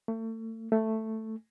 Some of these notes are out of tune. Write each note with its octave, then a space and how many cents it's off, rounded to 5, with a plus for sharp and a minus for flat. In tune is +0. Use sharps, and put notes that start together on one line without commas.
A3 +35
A3 +5